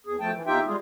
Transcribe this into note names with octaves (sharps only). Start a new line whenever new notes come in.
E2 G#4
D2 F3 A3 G5 A5
E3
E2 D#4 F4 G4 E5 G5
G3 G#3 F4 G#4